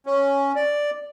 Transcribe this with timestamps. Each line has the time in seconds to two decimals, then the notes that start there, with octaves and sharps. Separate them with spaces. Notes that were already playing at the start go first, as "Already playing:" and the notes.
0.06 C#4
0.56 D5